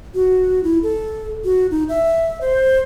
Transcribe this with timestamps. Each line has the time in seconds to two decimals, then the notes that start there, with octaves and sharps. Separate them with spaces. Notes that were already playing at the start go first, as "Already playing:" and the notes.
0.15 F#4
0.64 E4
0.83 A4
1.45 F#4
1.71 D#4
1.89 E5
2.41 C5